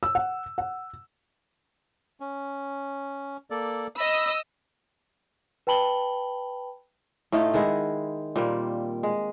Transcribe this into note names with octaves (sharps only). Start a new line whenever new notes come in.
E6
F#5
F#5
C#4
A#3 A4 D5
D#5 B5 E6
B4 G5 A5 B5 F#7 G7
A2 A3 D#4 F4
D#3 G#3 E4 F#5
A#2 G3 A#3 C4
G#3